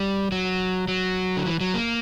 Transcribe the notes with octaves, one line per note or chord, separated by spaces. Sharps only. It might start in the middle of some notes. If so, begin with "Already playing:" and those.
Already playing: G3
F#3
F#3
D3
E3
F#3
A#3